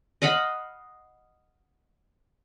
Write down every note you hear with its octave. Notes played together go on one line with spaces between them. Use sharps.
D#5 F5 F#5 B5